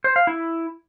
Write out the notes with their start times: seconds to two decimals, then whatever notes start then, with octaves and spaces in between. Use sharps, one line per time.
0.04 C5
0.16 F5
0.27 E4